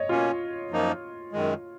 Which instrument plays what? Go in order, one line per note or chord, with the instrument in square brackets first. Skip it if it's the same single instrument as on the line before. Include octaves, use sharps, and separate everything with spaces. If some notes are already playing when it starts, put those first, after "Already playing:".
Already playing: [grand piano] C#5 D#5
[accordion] B2 A#3 C#4 [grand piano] F4
[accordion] F#2 F3 A#3 D#4
F#2 D#3 G#3